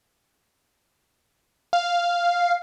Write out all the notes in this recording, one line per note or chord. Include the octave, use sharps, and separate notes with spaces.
F5